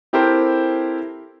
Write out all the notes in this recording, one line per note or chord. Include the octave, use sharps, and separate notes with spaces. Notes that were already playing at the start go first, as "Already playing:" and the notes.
C4 E4 G4 A4 A#4 C5